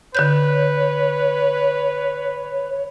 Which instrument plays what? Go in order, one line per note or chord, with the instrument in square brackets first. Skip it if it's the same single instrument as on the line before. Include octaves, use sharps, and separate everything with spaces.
[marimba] D3 F#6 G6 [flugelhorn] B4 [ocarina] C#5